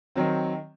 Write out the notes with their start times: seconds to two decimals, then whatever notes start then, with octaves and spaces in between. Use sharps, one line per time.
0.16 D#3 F#3 C4